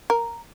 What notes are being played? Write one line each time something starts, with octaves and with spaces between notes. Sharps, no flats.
A#4